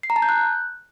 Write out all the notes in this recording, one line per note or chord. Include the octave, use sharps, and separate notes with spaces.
C7
A#5
A5
G6
F#6